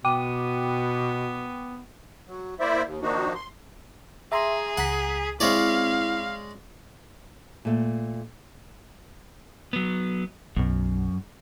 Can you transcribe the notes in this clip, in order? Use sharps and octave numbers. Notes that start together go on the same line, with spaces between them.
B2 B3 G5 D6 D#7
F#3
A#3 E4 C5 D5 E5
D#2
D#3 F3 A#3 D4 D#4 F#4
C6
G#4 E5 A#5 C6
C#2 F#5 A#5 B6
G#3 C4 E4 C#5 D5 F5
A#2 A3
F#3 B3
B1 F#2 B2